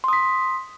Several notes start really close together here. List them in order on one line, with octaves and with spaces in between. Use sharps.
C6 D#6 B6